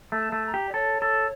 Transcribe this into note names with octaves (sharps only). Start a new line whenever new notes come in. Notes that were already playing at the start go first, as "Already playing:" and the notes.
A3
A5
A3
A#5
G4
D5
A4 C#5
A4